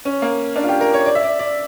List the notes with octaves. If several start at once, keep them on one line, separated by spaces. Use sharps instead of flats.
C#4
A#3
D4
F4
G4
A#4
C#5
D5
E5
D5
D5